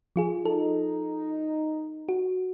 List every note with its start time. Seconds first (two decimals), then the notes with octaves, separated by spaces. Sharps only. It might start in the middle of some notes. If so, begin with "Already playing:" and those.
0.16 F3 F4 G#4
0.45 D#4 A4
2.09 F#4